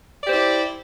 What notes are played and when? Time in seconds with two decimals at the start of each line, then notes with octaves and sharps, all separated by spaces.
0.23 D5
0.26 G4
0.29 C5
0.32 E4